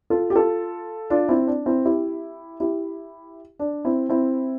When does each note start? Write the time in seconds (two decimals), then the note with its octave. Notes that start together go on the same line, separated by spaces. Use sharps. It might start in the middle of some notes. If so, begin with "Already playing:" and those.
0.10 F4 A4
0.30 G4
0.35 F4 A4
1.10 D4 F4
1.29 C4 E4
1.47 D4
1.66 C4 E4
1.85 E4 G4
2.60 E4 G4
3.59 D4
3.85 C4 E4
4.09 C4 E4